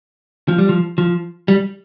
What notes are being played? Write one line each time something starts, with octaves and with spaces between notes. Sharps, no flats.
F3
G3
F3
F3
G3